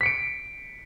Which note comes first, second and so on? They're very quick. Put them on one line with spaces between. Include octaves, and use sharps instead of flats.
B6 C#7 D7